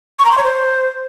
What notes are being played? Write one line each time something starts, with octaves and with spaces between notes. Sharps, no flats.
C#6
A#5
C6
C#5
C5